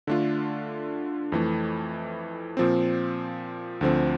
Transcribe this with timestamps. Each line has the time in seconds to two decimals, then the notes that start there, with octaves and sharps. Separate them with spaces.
0.07 D3 A3 D4 F4
1.32 F2 E3 A3
2.57 A#2 F3 C4
3.81 D2 D3 F3 C4